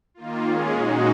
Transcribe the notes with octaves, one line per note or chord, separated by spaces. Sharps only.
D#3 A#3 F4
G#3 C#4 G#4
A#2 G#3 D#4 F#4